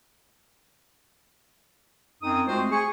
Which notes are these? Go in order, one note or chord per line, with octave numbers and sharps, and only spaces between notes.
F#2 C4 D#4 D#6
G#3 A3 C4 F4 F#4 C5
G#4 C#6